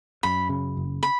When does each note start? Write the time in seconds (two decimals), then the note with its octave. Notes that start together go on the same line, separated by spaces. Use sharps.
0.23 F#2 B5
0.49 C#3
0.77 F#1
1.03 B5